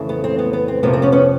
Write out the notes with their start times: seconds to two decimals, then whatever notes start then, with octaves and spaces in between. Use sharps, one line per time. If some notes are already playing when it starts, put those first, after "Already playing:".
Already playing: F2 C#3 E3 A3
0.09 B3
0.24 C4
0.39 B3
0.53 B3
0.68 C4
0.83 F2 C3 F3 A#3 B3
0.93 C4
1.02 B3 C#4
1.12 B3 C#4